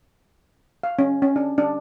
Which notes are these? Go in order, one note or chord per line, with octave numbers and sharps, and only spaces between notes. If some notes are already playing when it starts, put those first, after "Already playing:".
F5
C#4
C#4
D4
D4